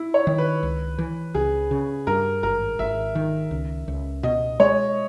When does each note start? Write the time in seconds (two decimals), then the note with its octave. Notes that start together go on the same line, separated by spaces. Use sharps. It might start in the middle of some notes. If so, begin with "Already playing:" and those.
Already playing: E4
0.14 C#5
0.27 D#3
0.38 B4
0.63 C#2
0.98 E3
1.35 C#2 G#4
1.71 C#3
2.07 G2 A#4
2.43 G#1 A#4
2.79 G#1 E5
3.15 D#3
3.51 C#2
3.88 C#2
4.23 B2 D#5
4.60 G#3 C#5